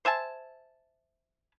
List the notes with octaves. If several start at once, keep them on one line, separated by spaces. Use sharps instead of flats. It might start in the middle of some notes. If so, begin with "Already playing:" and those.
C5 E5 G#5 A5